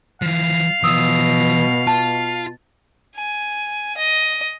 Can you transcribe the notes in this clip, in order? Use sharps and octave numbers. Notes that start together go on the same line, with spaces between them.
E3 F3 F5
B2 E3 F3 D#6 E6
F4 A5
G#5
D#5